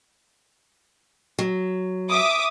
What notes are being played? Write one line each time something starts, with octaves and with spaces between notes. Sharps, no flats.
F#3
E5 D6 D#6